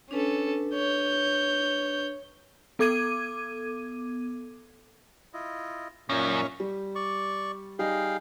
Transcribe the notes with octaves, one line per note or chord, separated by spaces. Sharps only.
C#4 D4 A4 B4
C#5 G6
B3 A4 D6 G#6 D#7
E4 F4 D#5
F#2 A#2 C#4 D#4 E5 F5
G3
D5 C#6
G3 D#4 G#4 F5 G5